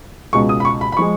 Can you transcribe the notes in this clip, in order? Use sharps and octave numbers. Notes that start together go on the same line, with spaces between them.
C#2 B2 G#3 C#6
D#6
B5
C#6
B5
B5
F3 G#3 C#6